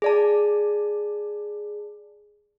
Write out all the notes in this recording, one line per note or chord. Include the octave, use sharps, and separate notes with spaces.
G#4 D5 A5